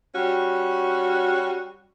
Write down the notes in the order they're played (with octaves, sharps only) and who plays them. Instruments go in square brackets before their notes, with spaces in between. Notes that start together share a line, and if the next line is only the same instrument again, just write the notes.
[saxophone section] G3 C#4 F#4